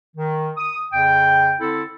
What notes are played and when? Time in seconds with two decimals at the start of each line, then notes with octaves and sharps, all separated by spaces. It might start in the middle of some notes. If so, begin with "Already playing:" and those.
0.16 D#3
0.57 D#6
0.93 F2 C#3 G5
1.60 D3 C4 E4 A4